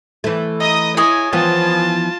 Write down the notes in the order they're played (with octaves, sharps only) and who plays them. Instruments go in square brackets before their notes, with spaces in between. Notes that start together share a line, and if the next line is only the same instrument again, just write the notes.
[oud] E3 A3
[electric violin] D#5 D#6 [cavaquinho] A#5
[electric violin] E4 G#5 [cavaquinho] G#4 C#5 D#5
[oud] E3 F3 B3 [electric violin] F4 A5